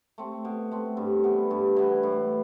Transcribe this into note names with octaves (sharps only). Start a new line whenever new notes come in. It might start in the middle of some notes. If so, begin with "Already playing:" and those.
A3 C4
B2
A3 C4
G2
E3 B3
G2
E3 B3
A2